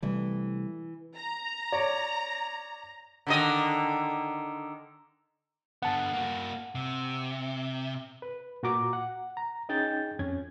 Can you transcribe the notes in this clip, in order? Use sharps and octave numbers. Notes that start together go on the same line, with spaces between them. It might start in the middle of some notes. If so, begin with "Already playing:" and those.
C3 E3 G3 A3
A#5
C#5 D5
D3 D#3 D#5
D3 B3 F#5 A5
A#3 F#4
C3
B4
A#2 F#4 A#5 D6
F#5
A#5
C#4 D#4 G#4 G5 G6 A6
F2 C#4 G#6